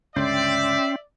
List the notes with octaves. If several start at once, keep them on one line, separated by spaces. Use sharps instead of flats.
C#2 G2 D3 C#4 D5 E5 G5 C6